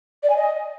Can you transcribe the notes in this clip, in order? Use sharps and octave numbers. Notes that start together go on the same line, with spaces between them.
D5
G#5
D#5